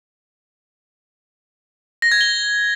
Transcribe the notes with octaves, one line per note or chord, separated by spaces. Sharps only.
A#6
G#6
G7